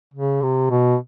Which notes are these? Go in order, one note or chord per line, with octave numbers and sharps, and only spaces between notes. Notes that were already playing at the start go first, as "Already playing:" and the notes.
C#3
C3
B2